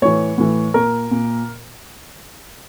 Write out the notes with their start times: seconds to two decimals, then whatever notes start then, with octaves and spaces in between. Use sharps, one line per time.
0.02 A2 E3 C#5
0.38 A2 E3
0.74 A#2 A#4
1.11 A#2